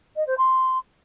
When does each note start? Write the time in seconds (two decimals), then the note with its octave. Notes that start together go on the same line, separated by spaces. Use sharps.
0.16 D#5
0.27 C5
0.38 C6